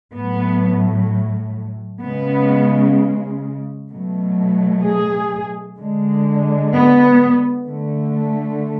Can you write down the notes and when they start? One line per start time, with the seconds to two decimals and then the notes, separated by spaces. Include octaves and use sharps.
0.14 A2 F#3 A3 B3
2.01 C#3 G#3 B3
3.90 B2 F#3 A3
4.84 G#4
5.78 D3 G#3
6.73 B3
7.66 D3 A3